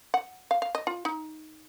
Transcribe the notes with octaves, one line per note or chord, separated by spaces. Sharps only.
F#5
F5
F5
D#5
F4
D#4